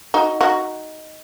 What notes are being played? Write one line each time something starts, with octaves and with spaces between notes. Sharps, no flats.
D#4 F#4
D#4 F#4